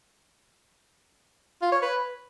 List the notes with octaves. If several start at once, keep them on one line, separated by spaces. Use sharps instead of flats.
F4
C#5
B4